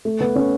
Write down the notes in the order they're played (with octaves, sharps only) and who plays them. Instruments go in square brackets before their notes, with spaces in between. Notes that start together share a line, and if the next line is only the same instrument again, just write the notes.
[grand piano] A3
B3
C#4